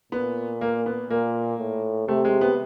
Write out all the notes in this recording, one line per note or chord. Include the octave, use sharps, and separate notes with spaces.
A#2 B3
A#3
B3
A#2 A#3
A2
C3 A3
G#3
B3